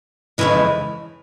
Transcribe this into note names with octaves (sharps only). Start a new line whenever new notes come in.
F2 C#3 E3 G#3